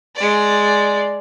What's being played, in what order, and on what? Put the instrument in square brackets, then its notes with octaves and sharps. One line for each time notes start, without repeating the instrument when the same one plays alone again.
[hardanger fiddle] G#3 D5